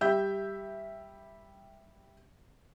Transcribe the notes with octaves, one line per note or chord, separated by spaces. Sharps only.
G3 G4 E5 G6